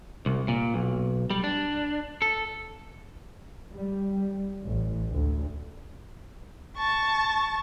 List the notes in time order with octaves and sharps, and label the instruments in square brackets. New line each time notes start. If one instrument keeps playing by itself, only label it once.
[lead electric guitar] C2
A#2
B1
G3
D4
A4
[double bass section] G3
A1
D2
[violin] A5 C#6